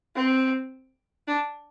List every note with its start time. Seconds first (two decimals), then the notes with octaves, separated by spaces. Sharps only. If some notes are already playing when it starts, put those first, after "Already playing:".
0.15 C4
1.28 D4